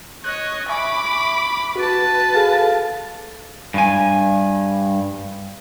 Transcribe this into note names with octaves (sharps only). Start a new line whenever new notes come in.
C#5 D#5 F#6
E5 G#5 B5 C#6 D6
F#4 B4 A5
G#4 A4 F5
G2 G#5